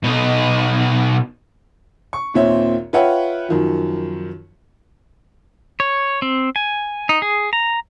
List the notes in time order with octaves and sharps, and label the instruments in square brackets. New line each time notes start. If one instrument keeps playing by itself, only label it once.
[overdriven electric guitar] B2 D#4
[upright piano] C#6
D#2 A#2 C4 C#5 E5
F4 B4 C#5 E5 F#5 G5
F#2 D#3 F3
[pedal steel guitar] C#5
C4
G#5
D#4
G#4
A#5